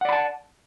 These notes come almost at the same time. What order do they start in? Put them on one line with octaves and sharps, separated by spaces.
F#5 D5 B5 A5